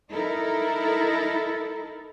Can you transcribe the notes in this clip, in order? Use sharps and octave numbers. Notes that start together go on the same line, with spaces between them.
D#4 E4 A4 A#4